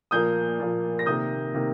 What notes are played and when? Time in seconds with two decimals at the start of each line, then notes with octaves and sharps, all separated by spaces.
0.11 A#2 F3 A#3 D#6 G6
0.59 A#2 F3 A#3
0.99 A#6
1.06 C3 D#3 A#3 D#6 G6
1.54 C3 D#3 A#3